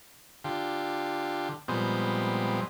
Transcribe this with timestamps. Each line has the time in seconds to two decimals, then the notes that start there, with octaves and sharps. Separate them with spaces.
0.44 D3 F4 G4
1.68 A#2 F3 G3 G#3 B3 C4